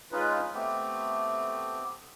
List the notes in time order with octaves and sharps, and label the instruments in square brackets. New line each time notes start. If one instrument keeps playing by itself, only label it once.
[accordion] G#3 F4 B4 [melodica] C#4 D#4
[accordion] A3 [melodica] B3 C4 G4